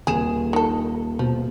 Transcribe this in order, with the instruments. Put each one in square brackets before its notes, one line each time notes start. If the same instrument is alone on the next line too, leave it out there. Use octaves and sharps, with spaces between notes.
[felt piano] D#1 E7 [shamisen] G#4
[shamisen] D#3 A4
[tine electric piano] B2 [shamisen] F3